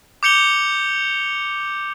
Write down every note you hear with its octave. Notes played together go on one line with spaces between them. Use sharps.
D6 G6 C#7 F7 G7